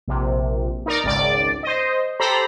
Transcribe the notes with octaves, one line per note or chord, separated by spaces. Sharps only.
A#1 C3
D#4 A#4 D5
G#1 C#2 D5
C5 D#5
G4 A4 C5 A#5 B5